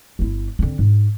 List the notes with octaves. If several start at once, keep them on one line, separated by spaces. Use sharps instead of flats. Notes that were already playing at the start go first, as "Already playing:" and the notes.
G1 E4
D3 C4
G#2